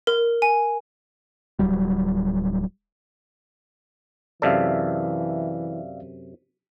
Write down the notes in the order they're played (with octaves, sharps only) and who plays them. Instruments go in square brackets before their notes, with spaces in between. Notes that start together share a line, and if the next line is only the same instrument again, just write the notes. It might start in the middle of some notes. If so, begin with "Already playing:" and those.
[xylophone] A#4
G#5
[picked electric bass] D1 F#3 G3
[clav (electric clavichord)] F#2 C3 A4 [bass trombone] E3 [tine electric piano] D5 E5 F5